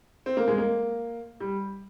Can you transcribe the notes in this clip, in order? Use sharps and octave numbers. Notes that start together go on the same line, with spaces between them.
C4
A#3
G#3
A#3
G3